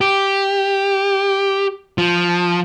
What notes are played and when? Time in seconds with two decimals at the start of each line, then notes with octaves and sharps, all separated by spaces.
0.01 G4
1.98 F3